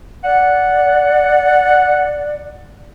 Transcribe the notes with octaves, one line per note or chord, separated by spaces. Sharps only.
D5 F#5